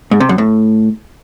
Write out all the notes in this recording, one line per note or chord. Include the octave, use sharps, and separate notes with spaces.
G#2
C3
F#2
A2